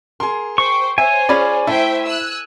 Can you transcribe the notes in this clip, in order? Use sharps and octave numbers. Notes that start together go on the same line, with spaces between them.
G#4 A#4 C6
C5 G5 C#6
C5 C#5 E5 G#5
C#4 F4 G#4 D5 B5
A3 E4 C5 E5 G5
E6 F#6